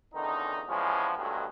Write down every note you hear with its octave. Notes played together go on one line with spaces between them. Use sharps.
E2 D3 D#3 C#4 D#4
E3 F3 G3 G#3 B3 C#4
B1 G2 D#3 F#3 G#3 A3